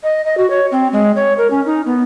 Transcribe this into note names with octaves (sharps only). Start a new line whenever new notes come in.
D#5
D#5
F#4
C#5
C4
G#3
C#5
A#4
C#4
D#4
B3